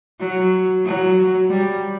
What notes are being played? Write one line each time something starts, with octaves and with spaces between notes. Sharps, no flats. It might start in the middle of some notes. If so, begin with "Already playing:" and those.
F#3
F#3
G3